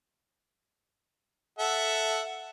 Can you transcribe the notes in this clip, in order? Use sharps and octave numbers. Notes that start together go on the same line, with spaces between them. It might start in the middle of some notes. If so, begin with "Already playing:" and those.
A4 E5 F#5